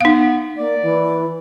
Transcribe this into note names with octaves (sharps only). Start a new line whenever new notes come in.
B3 D#4 F5
A#3 D5
E3